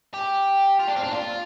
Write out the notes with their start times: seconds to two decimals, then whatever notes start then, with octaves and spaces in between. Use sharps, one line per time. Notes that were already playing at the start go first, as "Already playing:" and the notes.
0.14 G4
0.80 F4
0.88 D4
0.96 C4
1.04 D4
1.12 F4